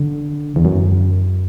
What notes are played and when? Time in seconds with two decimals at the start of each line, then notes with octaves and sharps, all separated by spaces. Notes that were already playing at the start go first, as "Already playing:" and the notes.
Already playing: D3
0.56 E2
0.65 F#2